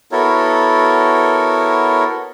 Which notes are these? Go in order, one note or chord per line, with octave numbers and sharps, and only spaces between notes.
B3 E4 F#4 A4 A#4 C#5